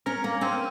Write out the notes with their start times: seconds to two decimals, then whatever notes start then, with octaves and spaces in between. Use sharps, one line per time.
0.06 C#4 A#4
0.24 A#3
0.41 C4 C#4